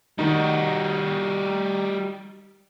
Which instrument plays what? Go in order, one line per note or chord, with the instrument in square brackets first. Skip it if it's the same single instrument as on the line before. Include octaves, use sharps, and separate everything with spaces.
[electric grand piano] D#3 D#4 [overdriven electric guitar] G3 F#4